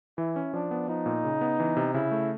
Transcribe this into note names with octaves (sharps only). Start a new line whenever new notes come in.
E3 E4
C#4
F3 D4
B3
F3 D#4
A#2
C#3
B3
E3
C3
C#3 E4
A3